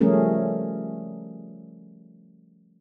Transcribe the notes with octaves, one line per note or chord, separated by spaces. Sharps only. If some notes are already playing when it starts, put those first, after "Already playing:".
F3 G3 A3 C#4 G#4 A#4